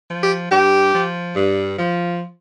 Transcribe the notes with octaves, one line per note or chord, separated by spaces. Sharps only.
F3
G4
G2 G4
F3
G2
F3